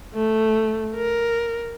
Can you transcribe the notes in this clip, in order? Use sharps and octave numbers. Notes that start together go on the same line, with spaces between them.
A3
A#4